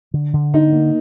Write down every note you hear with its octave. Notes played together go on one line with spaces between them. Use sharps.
D3
D3
D3 D#4
A#3